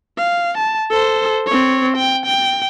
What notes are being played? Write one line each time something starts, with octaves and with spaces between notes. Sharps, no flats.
F5
A5
A4 C5
C4 C#5
G5
G5